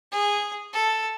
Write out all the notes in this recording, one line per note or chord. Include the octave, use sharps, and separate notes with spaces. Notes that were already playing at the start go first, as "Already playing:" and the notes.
G#4
A4